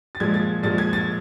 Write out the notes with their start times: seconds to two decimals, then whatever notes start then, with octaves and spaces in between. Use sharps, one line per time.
0.15 A6
0.20 A#2 F3 G#3 G#6
0.34 A6
0.63 A#2 F3 G#3 A6
0.78 G#6
0.93 A6